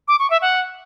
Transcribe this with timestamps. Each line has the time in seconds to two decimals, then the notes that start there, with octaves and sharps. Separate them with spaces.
0.08 D6
0.19 C#6
0.30 E5
0.42 F#5